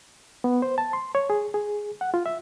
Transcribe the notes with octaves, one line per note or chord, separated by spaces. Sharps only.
B3
C5
A5
C6
C#5
G#4
G#4
F#5
F4
E5